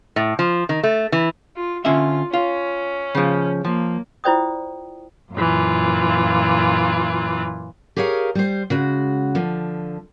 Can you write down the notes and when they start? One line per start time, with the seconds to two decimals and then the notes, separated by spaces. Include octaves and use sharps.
0.16 A2
0.39 F3
0.69 D#3
0.83 A3
1.12 E3
1.56 F4
1.85 D3 C#4 F4 E5
2.33 C#4 F4
3.15 C#3 F3
3.65 F3 A#3
4.24 E4 F4 C5 D5 G5 D#6
5.34 F#2 A#2 E3 F4
7.97 G4 G#4 A#4 C#5 F5
8.35 G3 C5
8.70 C#3 G#3 F#4
9.35 D3 F3